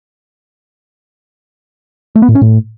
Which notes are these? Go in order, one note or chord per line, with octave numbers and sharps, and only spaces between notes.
A3
B3
A2
C#4
A2